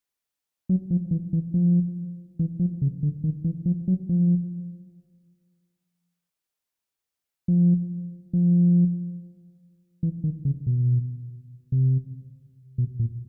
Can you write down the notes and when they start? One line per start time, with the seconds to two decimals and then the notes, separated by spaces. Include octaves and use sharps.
0.69 F#3
0.90 F3
1.11 E3
1.33 E3
1.54 F3
2.39 E3
2.59 F3
2.82 C#3
3.03 D3
3.24 D#3
3.44 E3
3.66 F3
3.88 F#3
4.09 F3
7.48 F3
8.33 F3
10.03 E3
10.24 D#3
10.45 C#3
10.67 B2
11.72 C3
12.78 B2
12.99 A#2